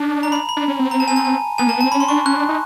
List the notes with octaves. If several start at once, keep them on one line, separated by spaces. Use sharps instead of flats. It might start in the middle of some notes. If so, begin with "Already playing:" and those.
Already playing: D4 A5
A#5
B5
B5
D4
C#4
C4
A#5
A5
G#5
A5
G#5
B3 G#5
A#3 A5
B3
C4 A5
C#4 B5
C6
D4 C#6
C#4 F#6
D4
D#4